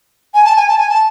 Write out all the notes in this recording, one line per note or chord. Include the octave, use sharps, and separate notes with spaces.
G#5
A5
G#5
A5
G#5
A5